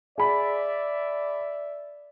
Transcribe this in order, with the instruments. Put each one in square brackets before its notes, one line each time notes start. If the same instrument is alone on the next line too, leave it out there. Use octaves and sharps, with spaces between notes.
[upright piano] G#4 B5 [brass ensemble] D5 E5